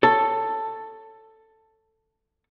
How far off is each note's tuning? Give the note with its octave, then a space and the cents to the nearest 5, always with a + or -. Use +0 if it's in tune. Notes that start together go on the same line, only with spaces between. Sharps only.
A4 +10 C#5 +0